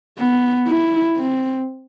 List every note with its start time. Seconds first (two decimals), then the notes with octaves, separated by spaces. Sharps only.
0.19 B3
0.68 E4
1.17 C4